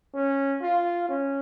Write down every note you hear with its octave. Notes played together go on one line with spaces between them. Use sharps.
C#4
F4
C#4